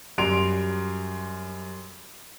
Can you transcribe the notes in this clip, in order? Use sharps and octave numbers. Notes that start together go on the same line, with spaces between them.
F#2 G3 C6 D7 F7